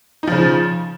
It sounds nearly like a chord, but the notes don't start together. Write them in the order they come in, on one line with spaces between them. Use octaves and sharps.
D#4 F3 C#3